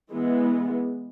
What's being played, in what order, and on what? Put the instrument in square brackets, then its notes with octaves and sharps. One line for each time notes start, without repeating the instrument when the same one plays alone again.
[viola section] E3 G#3 B3